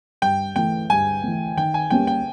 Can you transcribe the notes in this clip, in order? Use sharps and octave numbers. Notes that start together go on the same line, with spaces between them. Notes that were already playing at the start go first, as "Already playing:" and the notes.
G2 G5
E3 A3 G5
G2 G#5
E3 A3
D#3 G5
G#5
G3 A#3 C#4 G5
G5